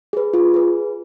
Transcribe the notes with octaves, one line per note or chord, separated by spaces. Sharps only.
G#4 B4
F4
G#4 B4